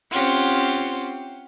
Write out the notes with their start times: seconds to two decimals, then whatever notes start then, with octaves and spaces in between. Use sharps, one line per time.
0.11 C4 C#4 F4 G4 F#5